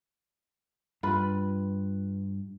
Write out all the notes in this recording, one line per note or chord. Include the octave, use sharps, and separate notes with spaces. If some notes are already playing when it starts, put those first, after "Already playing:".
G2 F4 B4 B5